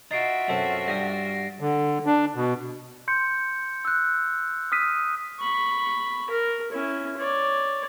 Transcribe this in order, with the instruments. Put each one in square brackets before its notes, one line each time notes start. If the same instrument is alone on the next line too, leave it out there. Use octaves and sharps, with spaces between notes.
[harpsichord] D#4 [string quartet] F4 F#4 E5 [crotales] A6 C7 D7
[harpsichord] F#2 C4 A4
[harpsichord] G2 G4 D#6 [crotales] A#6
[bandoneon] D3
D4
B2
[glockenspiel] C6 G6 C#7
E6 F#6
D#6 F6 B6 D#7
[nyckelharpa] B5 C#6
A#4
C#4 E4
C#5 D5